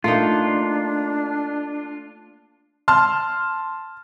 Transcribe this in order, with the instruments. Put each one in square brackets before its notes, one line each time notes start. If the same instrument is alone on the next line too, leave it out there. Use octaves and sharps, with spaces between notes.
[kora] A3 A#3 D#4 [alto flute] D4 [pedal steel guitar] F4
[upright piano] A5 C6 F6